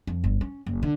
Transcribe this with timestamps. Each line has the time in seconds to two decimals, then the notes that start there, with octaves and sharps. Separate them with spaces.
0.07 F2
0.24 G1
0.41 C#4
0.66 F#1
0.83 D3